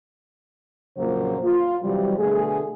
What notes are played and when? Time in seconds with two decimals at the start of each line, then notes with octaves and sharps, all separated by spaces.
0.97 F2 A#2 C#3 F#3 A#3 C5
1.44 F4
1.83 C3 E3 F#3 G3
2.18 B2 D3 A3 G#4